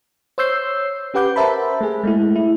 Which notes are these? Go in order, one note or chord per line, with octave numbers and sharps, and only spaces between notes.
C5 C#5 E6 G6 C7
C#4 G4 B4 F#5 D6 G6
A#4 C5 E5 A5 B5
A3 G#4
G#3 A3 E4
E4